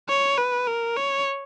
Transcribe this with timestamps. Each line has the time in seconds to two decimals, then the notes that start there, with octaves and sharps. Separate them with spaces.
0.09 C#5
0.38 B4
0.67 A#4
0.96 C#5